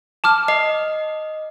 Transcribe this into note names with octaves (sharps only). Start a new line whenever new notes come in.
A5 D6 F6
D#5 C7